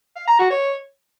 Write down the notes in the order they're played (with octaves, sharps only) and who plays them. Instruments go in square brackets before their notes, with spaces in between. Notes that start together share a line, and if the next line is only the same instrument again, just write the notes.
[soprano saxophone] F5
A#5
F#4
C#5